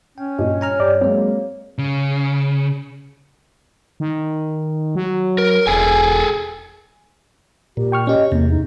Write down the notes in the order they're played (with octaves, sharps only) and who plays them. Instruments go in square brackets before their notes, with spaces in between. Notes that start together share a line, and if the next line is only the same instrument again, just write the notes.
[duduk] C#4 [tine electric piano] G5
[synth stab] G2 A#2 [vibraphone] D#5
[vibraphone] C#5 [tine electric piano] G#5 A#5 F6
[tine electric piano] G2 [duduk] G4 [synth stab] D5
[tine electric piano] F#3 G#3 [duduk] A#3 [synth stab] C4
[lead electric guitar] C#3
[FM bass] D#3
F#3
[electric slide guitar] A#4
[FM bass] E1 [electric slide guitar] G#4 A4 G#5
[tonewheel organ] A#2 [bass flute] G4
[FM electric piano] G5 C#6 F6
[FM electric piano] C#4 G4 [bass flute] D#5
[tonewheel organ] E2 [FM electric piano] C3 [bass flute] A#3
[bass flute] D#4